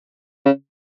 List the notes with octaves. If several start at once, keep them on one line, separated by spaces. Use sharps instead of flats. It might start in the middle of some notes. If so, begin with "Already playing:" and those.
C#3